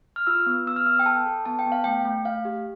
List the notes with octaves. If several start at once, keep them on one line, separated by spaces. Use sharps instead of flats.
F6
F4 E6
B3
B3 E6
F6
B3 E6
G5
A4 A5
A4
B3 A5
G5
B3
F5
A3 G5
A3
A3 F5
G4